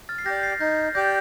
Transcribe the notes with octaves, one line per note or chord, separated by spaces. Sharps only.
F6 A6
C7
G4 D5 G6 A#6
A6 C7
D#4 G6 A#6
G4 D5 G6 A#6